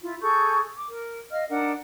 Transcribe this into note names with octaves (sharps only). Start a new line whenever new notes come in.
E4 F4
G#4 A4 C#6 G6
D6
A#4
D#5 F5 F6
D4 D#4 A#4 F#5